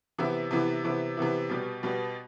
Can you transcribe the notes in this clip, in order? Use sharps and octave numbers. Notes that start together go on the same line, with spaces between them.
C3 E3 B3 E4
C3 E3 B3 E4
C3 E3 B3 E4
C3 E3 B3 E4
B2 G3 B3
B2 G3 B3